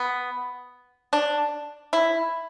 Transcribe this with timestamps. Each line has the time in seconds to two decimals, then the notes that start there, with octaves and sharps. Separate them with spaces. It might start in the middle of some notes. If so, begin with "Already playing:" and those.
Already playing: B3
1.13 D4
1.93 E4